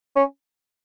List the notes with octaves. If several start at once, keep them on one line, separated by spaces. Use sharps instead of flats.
C#4